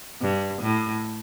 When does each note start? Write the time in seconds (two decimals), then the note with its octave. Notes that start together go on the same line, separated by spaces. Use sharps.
0.22 G2
0.62 A2